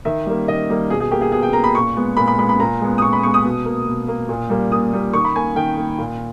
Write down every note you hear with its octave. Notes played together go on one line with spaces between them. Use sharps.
D#3 E5
G3 A#3
D#3 D#5
G3 A#3
B2 G#4
G#4
A#3 G4
G#4
B2 G#4
G5
A#3 A#5
B5
A#2 C#6
G#3 B3
A#2 B5
B5
G#3 B3 B5
B5
A#2 A#5
G#3 B3
D#6
A#2 C#6
B5
G#3 B3 C#6
D#6
B2
A#3
B2
A#3
A#2
G3 A#3
A#2 D#6
G3 A#3
D#3 C#6
B5
A#3 G#5
D#3 G5
A#3
A#2